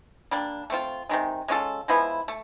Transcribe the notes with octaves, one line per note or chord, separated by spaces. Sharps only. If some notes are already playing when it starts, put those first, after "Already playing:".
G3 A#3 D4
A3 C4 F4
C3 D#3 G#3
G#3 C#4 F4 A4
F3 G#3 B3 E4
A3